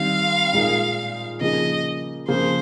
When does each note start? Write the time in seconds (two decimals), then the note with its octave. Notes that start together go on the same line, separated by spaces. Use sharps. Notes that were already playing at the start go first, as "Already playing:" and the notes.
Already playing: D#3 G3 C4 F5
0.53 A#2 G#3 D#4 A#4
1.41 C#3 F3 A#3 D#4 G#4 D#5
2.28 C#3 F3 A#3 F4 G#4 C5